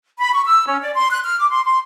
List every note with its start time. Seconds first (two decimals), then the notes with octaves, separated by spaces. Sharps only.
0.20 B5
0.33 C#6
0.45 E6
0.67 C#4
0.82 D5
0.94 C6
1.11 F#6
1.24 F6
1.39 D6
1.50 C6
1.65 C6